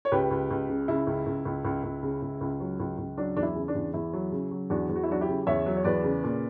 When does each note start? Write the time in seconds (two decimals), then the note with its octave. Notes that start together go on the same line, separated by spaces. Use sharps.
0.05 C#5
0.12 C#2 G4 B4
0.31 C#2
0.50 C#2
0.68 C#3
0.88 C#3 E4
1.07 C#2
1.26 C#2
1.45 C#2
1.65 C#2
1.83 C#2
2.03 C#3
2.22 C#2
2.41 C#2
2.60 F#3
2.80 C#2
2.98 C#2
3.17 F#3 D4
3.37 E2 D4
3.43 E4
3.56 C#3
3.68 D4
3.75 E2
3.94 E2 E4
4.13 F#3
4.32 C#3
4.51 F#3
4.70 E2 D4 F#4
4.89 E2
4.96 F#4
5.03 E4
5.08 F#3 D4 F#4
5.21 E4 G4
5.28 C#3
5.47 E2 C#5 E5
5.66 F#3
5.76 C#5
5.84 E2 B4 D5
6.04 C#3
6.23 A#2